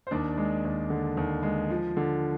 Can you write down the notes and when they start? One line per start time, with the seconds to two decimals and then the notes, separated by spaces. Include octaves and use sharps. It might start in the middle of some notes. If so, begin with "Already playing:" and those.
0.07 C5
0.11 D#2 D4 D5
0.37 G#3
0.65 D#2
0.90 D3
1.17 D#2
1.43 G#3
1.70 F3
1.97 D3